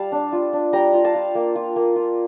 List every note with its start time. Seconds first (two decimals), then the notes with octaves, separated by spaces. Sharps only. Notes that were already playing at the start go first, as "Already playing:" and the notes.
Already playing: G3 F5 A5
0.12 D4
0.32 F4
0.53 D4
0.73 G3 G5 A#5
0.93 F4
1.04 F5 A5
1.15 F4
1.35 A#3
1.56 F4
1.76 A#3
1.96 F4